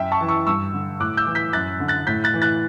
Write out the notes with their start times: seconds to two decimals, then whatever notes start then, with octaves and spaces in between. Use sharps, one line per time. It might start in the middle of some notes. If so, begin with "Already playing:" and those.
Already playing: F#2 E5 G5
0.12 A5 C#6
0.21 E3
0.29 C#6 E6
0.47 G2 C#6 E6
0.73 D3
1.00 A2 D6 F#6
1.17 E6 G6
1.27 E3
1.35 G6 B6
1.53 F#2 F#6 A6
1.80 D3
1.88 F#6 A6
2.07 A2 G6 B6
2.24 F#6 A6
2.34 E3
2.42 F#6 A6